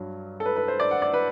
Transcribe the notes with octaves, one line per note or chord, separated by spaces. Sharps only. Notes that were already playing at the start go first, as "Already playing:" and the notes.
Already playing: G2 F#3
A4
B4
B4
C5
D5
F#5
D5
B4